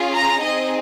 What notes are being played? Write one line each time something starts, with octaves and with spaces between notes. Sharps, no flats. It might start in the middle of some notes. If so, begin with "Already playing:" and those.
Already playing: C#4 F4 G#4
A#5
C4 D#4 G#4 D#5